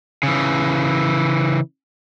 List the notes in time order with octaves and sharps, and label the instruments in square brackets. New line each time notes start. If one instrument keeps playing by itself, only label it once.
[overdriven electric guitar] C#3 E3